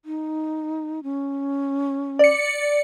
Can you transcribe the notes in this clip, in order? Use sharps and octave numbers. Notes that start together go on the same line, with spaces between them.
D#4
C#4
D5 C#7